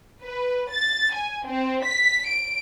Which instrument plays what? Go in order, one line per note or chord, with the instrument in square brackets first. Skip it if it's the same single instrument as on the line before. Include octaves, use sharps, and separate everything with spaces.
[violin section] B4
A6
G#5
C4
B6
D7